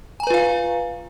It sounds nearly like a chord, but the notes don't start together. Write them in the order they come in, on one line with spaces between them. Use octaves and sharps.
G#5 A#5 B4 F4 F5